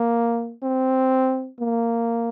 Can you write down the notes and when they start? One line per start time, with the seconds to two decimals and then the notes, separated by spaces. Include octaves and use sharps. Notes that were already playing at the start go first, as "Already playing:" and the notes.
Already playing: A#3
0.63 C4
1.60 A#3